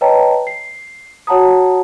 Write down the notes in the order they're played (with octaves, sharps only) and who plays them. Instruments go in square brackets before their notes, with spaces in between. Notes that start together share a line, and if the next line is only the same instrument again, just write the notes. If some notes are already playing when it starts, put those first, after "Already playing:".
[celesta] B4 C#5 D#5 G5 A5 A#5
C7
F#4 C#5 F#5 A5 A#5 D#6